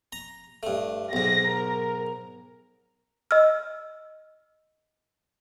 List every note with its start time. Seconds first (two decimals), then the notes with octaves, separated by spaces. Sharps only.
0.12 A#5
0.63 G2 A3
1.13 B1 G#2 A#6
1.48 A#4
3.31 D#5 E6 F6